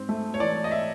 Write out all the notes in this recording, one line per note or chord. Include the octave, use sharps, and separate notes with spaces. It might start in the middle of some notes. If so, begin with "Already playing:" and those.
Already playing: G#2 C4
A3
C#5
E3 D5
D#5
E5